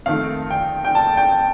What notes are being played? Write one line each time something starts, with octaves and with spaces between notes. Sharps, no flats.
F2 D#3 A3 F5
G5
G5
A5
G5